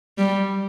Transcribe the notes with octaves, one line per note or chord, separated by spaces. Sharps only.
G3